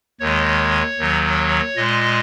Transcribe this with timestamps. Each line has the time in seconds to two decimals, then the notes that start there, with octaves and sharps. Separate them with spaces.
0.20 D#2 D#3 G#3 C#5
0.99 D#2 D#3 F#3
1.76 A#2 G#3 D#5